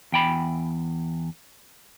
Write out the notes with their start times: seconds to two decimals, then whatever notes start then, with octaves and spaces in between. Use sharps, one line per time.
0.12 E2 G5 B5